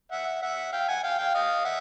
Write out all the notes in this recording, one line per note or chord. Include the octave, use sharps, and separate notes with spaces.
E5 F#5
E5 F#5
F5 G5
F#5 G#5
F5 G5
F5 G5
D#5 F5
E5 F#5